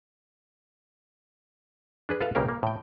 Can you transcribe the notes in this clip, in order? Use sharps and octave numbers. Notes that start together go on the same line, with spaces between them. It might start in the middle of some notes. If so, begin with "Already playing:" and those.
D4 G#4 B4
F4 A4 B4 E5 F5
B1 C#3 A#3 G4 A#4 F5
A#3
A2 G5